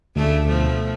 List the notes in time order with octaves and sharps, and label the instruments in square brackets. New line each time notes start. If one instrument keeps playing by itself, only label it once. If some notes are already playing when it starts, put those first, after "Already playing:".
[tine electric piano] D2 [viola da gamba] C#3 A3 D4
[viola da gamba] B2 F3 A3